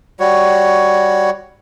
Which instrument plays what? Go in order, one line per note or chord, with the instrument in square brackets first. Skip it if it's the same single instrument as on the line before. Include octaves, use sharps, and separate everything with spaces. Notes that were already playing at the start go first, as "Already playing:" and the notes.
[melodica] G3 F#4 C#5